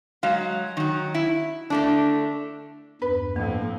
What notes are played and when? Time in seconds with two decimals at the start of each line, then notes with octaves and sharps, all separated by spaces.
0.23 F#3 G#3 F5
0.77 D#3 F#3
1.15 E4
1.70 D3 A3 D4
3.02 E2 G2 B4
3.36 F2 A2 A#3 C4